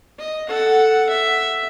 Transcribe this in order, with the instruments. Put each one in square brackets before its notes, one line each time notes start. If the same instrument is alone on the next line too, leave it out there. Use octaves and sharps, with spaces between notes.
[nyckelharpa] D#5
A4 F#5
E5